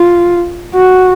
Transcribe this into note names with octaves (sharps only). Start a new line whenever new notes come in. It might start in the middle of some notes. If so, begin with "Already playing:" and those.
Already playing: F4
F#4